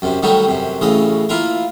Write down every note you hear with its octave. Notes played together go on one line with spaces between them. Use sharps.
F#2 C3
D#3 F#3 G3 A3 D#4
F#2 C3
A1 C#3 E3 D#5
A#3 E4 F4 A#4